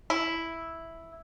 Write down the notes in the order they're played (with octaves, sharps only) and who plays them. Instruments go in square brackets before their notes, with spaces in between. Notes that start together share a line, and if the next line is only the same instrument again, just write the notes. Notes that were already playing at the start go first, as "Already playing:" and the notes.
[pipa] E4